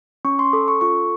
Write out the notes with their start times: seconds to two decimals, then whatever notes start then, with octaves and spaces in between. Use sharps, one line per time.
0.25 C#4 C#6
0.39 C6
0.53 A4 D6
0.68 C#6
0.81 F4 C#6